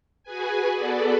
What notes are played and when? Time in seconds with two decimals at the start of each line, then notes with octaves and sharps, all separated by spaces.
0.23 F#4 G#4 B4 G#5
0.73 B3 F#4 G#4 A4 B4 D5